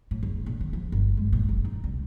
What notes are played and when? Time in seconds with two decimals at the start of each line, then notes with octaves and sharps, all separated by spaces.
0.11 A2
0.23 F#1
0.46 A#1
0.61 D3
0.73 F3
0.92 G1
1.17 G#3
1.33 A#2
1.49 F#1
1.65 D#4
1.84 C2